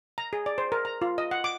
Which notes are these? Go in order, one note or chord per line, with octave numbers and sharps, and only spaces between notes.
A#5
G#4
D5
C5
A#4
A#5
F4
D#5
F#5
D6